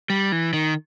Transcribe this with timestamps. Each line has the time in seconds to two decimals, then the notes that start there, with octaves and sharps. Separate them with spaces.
0.10 G3
0.32 E3
0.53 D#3